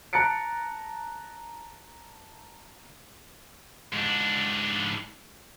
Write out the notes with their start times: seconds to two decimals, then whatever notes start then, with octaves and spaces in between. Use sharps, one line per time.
0.13 A5 A#5 F#6 A6 C#7 D7
3.93 G#2 D4